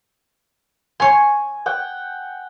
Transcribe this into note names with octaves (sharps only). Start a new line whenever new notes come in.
C#5 G#5 C6
F#5 G5